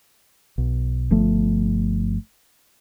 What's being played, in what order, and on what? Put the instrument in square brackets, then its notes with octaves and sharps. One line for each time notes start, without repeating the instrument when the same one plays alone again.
[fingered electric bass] B1
G1 F3 A3